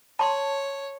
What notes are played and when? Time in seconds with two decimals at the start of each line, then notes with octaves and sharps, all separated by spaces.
0.19 C#5 A5 C6